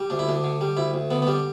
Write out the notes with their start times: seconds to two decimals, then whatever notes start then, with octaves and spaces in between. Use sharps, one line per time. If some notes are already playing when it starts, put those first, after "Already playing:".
Already playing: G3
0.10 D2 D4
0.19 E4
0.28 D2 D4
0.44 D3
0.61 G3
0.77 D2 E4
0.94 D2
1.11 D3 B3
1.22 B3
1.27 G3 D4